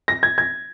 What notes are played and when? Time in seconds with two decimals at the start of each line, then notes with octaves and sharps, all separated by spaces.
0.08 A#6
0.23 G#6
0.38 G#6